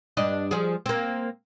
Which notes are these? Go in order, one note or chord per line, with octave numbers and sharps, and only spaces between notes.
G2 D4 D#5
F3 G#4
A#3 C4